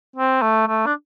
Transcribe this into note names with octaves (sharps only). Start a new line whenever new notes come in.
C4
A3
A3
D4